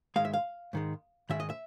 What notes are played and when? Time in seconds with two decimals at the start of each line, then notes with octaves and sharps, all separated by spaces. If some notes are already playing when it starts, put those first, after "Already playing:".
0.16 G#2 D#3 G#3 F5
0.25 E5
0.33 F5
0.73 G#2 D#3 G#3
1.30 G#2 D#3 G#3 E5
1.40 D#5
1.50 E5